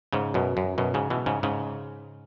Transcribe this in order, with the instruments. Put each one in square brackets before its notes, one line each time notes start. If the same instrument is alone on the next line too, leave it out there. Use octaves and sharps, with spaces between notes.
[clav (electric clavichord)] G#2 C#3
F#2 B2
F#2
F#2 B2
G#2 C#3
B2 E3
G#2 C#3
G#2 C#3